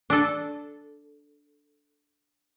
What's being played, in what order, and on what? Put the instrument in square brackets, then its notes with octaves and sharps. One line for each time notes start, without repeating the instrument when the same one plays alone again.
[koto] D4 A4